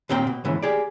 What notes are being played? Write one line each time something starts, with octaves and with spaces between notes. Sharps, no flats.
D#2 A#2 C4 G5
B2
D#2 G#2 C#3 E3
G4 G#4 D5